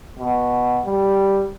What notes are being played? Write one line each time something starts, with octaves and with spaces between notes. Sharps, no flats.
B2
G3